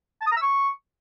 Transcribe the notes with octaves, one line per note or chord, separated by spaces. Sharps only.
A5
D#6
A#5
E6
C#6